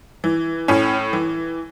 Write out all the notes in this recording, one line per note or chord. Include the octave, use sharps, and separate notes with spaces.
E3
A2 C#4
E3